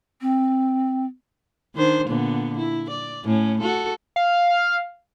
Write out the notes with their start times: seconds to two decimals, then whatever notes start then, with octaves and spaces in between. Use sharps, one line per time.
0.21 C4
1.75 D#3 D4 C5
2.08 A#2 D3 B3
2.58 E4
2.90 D5
3.25 A2 C#4
3.61 F#4 A4
4.16 F5